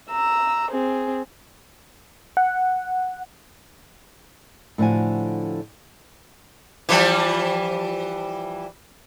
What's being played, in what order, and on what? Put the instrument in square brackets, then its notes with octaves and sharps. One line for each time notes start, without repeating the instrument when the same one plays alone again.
[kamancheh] A#5 E6
C4 G#4
[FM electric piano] F#5
[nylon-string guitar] A2 D3 F3 F#4 G#5
[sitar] E3 F3 G3